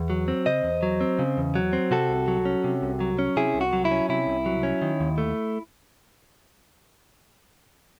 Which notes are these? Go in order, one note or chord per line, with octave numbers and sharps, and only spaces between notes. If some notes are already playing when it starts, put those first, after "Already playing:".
Already playing: E2
F#3
C4
C#3 C5 D#5
E2
F#3
C4
C#3
E2
F#3
C4
C3 F#4 A4
C2
F#3
C#4
C3
C2
F#3
C#4
C3 E4 G#4
C2
F#4
F#3
E4
C#4
C3 E4
C2
F#3
C#4
D#3
D#2
A3